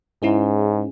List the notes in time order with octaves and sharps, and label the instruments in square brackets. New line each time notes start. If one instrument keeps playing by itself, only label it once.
[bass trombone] G#2 [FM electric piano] C#4 E4 G#4